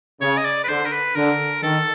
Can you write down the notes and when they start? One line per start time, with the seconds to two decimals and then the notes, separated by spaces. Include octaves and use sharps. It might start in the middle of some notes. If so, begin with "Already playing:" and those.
0.21 C#3 C#5
0.37 D#5
0.45 D5
0.64 B4
0.68 D3 C5
0.85 A#4
0.92 B4
1.16 D3 A#4
1.63 D#3 A4